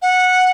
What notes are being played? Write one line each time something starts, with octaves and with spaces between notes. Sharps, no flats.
F#5